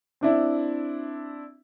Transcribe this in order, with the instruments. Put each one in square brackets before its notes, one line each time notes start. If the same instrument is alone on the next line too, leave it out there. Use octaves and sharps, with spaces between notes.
[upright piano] C4 D4 E4